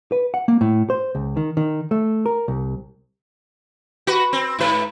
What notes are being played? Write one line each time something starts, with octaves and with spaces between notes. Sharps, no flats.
B4
F#5
A#3
A2
C5
C#2
D#3
D#3
A3
A#4
C2
F#4 B4
C4
G#2 B4